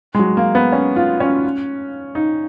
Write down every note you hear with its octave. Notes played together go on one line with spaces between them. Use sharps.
G#3
F#3
A#3
B3
C#4
F4
C#4
D#4